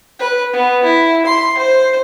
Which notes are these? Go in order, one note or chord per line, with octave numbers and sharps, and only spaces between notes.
B4
B3
E4
C6
C5